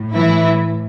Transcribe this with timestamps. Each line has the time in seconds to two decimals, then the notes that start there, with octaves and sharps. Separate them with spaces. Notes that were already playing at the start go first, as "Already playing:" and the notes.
Already playing: A2
0.15 E3 E4